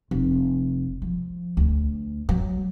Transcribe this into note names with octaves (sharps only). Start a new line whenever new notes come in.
F1
F3
D2
F#3